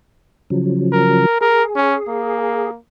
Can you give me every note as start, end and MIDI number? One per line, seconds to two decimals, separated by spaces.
0.50 1.26 49
0.50 1.26 53
0.50 1.26 54
0.93 1.38 70
1.41 2.71 68
1.41 1.64 70
1.76 1.96 61
2.09 2.79 58